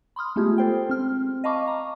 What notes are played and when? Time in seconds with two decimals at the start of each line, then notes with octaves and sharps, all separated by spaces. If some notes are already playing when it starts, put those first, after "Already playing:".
0.16 B5 C6 D#6 F6
0.36 G#3 A3 B3 F4 G4 G#4
0.58 A4 C5 G5
0.89 C4 F6
1.44 D#5 F5 A5 B5 C#6 D6
1.67 A#5